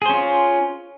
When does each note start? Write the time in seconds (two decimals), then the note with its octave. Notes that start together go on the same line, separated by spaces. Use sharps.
0.02 G#4
0.06 C5
0.10 C#4
0.14 F4